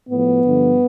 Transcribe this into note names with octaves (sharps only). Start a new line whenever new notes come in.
A2 F3 B3
G2 D3 F3